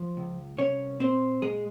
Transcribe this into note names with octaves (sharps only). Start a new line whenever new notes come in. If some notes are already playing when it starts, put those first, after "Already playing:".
Already playing: F3
C#2
C2 C#4 C#5
A#2 C4 C5
A#2 G#3 G#4